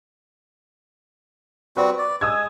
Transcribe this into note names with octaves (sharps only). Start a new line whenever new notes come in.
G3 C4 F#4 B4
D5
G#3 D#6 E6 G#6